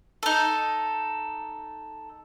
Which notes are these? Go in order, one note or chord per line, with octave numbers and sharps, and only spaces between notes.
D#4 A4